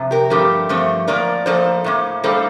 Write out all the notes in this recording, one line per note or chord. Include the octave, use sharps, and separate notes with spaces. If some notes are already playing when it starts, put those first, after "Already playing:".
Already playing: F2 C3
G4 A#4
G2 F3 A3 C4 G4 A#4
G2 F3 A3 C4
A2 F3 A#3 A#4 D5
A2 F3 A#3 A4 C5
A2 G3 A#3
A2 G3 A#3 A4 C5